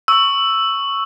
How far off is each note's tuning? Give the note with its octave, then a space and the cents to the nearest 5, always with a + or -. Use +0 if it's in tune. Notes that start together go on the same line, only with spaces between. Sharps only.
C#6 +0 E6 +0